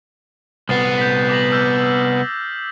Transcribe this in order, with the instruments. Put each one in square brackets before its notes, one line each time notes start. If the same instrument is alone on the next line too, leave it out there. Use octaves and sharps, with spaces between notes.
[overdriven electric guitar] C2 B3 [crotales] D#6 A6 C7
[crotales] G6 B6
D6 A#6 F#7
E6 F6 G6